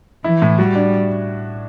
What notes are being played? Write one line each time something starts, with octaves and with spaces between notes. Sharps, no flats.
E3 E4
A2
G3 F#4
D4